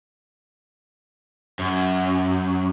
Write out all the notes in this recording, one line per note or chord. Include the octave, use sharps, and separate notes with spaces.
F#2